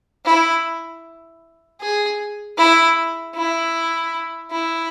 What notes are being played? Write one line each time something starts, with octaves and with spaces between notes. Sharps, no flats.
E4
G#4
E4
E4
E4